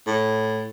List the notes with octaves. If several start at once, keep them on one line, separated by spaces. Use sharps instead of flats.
A2